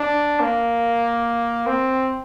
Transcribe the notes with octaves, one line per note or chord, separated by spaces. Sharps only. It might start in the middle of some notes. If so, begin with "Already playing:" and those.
Already playing: D4
A#3
C4